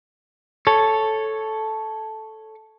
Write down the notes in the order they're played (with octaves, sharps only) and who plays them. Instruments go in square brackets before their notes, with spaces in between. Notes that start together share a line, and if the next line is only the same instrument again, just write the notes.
[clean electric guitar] A4 C#5